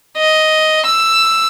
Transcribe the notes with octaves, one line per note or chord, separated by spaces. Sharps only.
D#5
E6